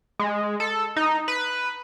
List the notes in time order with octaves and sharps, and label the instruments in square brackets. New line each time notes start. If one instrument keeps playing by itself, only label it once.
[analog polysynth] G#3
A4
D#4
B4